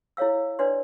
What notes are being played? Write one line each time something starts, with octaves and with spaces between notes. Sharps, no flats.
E4 A4 C#5 F5 E6
D4 B4 C#5 D5 C6